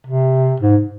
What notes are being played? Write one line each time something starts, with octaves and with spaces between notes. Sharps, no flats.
C3
G#2